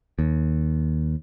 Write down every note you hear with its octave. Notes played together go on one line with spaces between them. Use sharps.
D#2